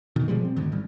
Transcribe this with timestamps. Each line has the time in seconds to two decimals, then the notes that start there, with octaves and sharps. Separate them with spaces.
0.16 B2 D#3
0.28 B2 F3 G3 G#3
0.45 C4
0.56 D2 G#2 D#3
0.72 A1 G#2 G3